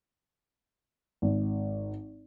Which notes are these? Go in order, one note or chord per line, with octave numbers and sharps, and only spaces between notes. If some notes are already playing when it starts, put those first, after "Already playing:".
G#1